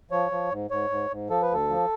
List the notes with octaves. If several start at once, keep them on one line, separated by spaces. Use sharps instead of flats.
F3 C#5
F3
G#2
G#2 C#5
G#2
G#2
F3 A4
B4
D2 A4
F3